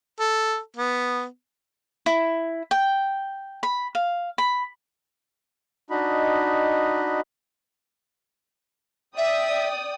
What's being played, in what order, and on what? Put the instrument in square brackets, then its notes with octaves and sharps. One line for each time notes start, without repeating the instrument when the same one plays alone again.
[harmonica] A4
B3
[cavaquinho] E4
G5
B5
F5
B5
[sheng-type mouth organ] D4 D#4 F#4 D#5 B5
[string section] D5 G5 D#6 [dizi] E5